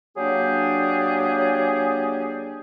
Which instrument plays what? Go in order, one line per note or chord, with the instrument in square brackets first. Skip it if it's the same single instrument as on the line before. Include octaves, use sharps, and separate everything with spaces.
[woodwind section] F#3 A#3 D4 G4 G#4 D5